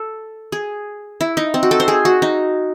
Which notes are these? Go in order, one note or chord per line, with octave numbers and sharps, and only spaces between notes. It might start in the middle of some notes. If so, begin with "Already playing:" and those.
Already playing: A4
G#4
E4
D#4
C4
F#4
A4
C5
G#4
F#4
D#4